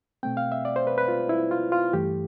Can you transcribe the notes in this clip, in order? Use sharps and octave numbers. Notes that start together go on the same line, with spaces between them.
B2 A3 C4 G5
F5
E5
D5
C5
B4
B4
F4
E4
F4
F4
G2 E3 A3 G4